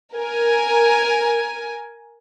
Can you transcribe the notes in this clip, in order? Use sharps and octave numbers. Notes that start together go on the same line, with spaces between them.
A#4 G#5